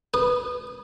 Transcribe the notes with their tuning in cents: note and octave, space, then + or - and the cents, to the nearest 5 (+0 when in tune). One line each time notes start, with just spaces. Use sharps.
B4 +0 D#6 -25